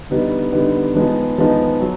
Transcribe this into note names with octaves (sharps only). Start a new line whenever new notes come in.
D3 G3 B3 D#4
D3 G3 B3 D#4
F3 G#3 B3 D#4
F3 G#3 B3 D#4
F#3